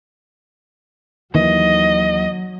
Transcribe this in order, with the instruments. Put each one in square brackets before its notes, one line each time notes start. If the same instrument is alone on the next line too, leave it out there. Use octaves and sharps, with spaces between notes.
[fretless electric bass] D#2 D#3 E3 [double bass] F#3 [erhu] D#5